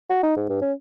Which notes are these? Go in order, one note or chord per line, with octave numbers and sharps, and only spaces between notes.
F#4
D#4
G#2
G2
C#4